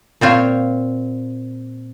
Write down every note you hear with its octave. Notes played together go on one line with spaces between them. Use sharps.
A#2 C4 F4 C#5